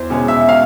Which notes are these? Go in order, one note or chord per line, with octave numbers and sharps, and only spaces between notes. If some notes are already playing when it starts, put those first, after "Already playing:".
Already playing: E2 C5
B2 G#3 C#4
E5
F5